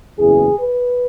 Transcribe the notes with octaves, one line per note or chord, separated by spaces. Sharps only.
F#1 E2 E3 G#4
B4